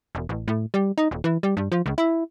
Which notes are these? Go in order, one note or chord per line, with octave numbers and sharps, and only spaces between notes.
E1
A1
A2
G3
D#4
D#1
E3
G3
G2
F3
C#2
E4